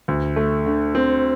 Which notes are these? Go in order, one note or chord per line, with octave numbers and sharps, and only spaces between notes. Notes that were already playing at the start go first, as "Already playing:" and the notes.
D2
A3
D3
C4